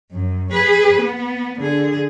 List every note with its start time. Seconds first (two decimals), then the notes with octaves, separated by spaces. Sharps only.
0.12 F#2
0.51 G#4 B4
0.99 B3
1.60 D3 G#4